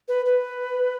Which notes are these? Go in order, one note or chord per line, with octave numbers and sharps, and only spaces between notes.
B4
B4